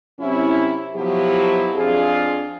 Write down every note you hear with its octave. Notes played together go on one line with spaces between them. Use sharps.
F#2 C3 C#4 E4
B2 F3 F#3 E4 G4
F2 D4 F4 G#4